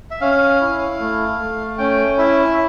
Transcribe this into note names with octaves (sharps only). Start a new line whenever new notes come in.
E5
C#4 F5
E4
A3
A3
C#4 G5
E4 E5